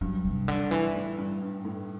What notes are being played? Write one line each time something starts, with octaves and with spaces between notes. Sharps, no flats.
G2 F#3
C3
D3
E3
A2
G2
G2
A2